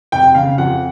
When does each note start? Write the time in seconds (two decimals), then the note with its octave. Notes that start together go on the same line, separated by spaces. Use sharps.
0.12 F1 G5
0.35 C#3 F5
0.58 F2 F#5